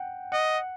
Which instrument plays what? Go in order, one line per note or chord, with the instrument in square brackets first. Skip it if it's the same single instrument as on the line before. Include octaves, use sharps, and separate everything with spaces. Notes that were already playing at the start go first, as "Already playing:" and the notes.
Already playing: [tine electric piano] F#5 G5
[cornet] D#5 [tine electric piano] F#5